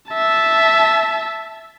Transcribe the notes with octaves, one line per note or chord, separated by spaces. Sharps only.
E5 A5